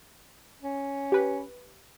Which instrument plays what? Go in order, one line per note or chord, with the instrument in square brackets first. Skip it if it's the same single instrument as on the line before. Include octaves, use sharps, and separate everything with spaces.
[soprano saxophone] C#4
[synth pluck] G4 B4